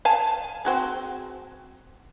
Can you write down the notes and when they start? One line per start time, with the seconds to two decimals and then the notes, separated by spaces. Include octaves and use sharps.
0.05 F5 G#5 A5
0.65 C4 F#4 G#4